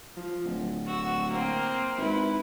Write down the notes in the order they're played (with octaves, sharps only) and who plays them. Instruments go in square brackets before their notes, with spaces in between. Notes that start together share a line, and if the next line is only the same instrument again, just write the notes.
[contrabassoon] F3
D1
[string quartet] F#4 E6
A#3 C4
[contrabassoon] G#1 [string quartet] E4 B4